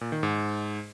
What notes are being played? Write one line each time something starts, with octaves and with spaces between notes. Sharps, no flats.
A#2
D#3
G#2